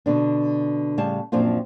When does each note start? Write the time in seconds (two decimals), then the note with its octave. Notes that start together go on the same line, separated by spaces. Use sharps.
0.06 B2 D3 D4
0.98 A2 C#3 G3 A5
1.32 F#2 A#2 F3 C4 D4 F4